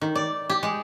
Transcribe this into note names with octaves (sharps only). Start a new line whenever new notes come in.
D#3
D5
G4
G#3